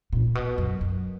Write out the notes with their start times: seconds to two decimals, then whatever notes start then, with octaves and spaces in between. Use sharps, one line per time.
0.13 A#2
0.35 B2
0.58 F#2
0.81 F#2